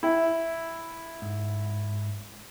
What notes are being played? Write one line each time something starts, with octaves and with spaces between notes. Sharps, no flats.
E4 G5
G#2